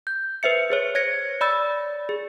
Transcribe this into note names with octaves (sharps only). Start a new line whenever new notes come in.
G6
B4 C5 E5 C#7
G#4 C5 C#5
C#5 G#6 A#6 C#7
D5 B5 E6 A6
G#4